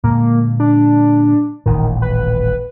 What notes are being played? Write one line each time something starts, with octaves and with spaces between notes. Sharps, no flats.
A#2 D3 G#3 A#3
D4
D#1 A1 A#2 D#3
B4